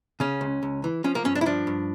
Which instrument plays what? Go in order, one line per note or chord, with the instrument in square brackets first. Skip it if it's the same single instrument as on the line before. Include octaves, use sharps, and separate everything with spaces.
[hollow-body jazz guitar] C#3 C#4
C#2
C#2
E3
F3 C#4
A#3
G2 C#4
D4
E4
F3 D4
G2